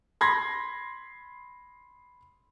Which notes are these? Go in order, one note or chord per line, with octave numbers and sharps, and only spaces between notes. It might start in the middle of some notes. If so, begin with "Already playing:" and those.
B5 C6 G#6 A#6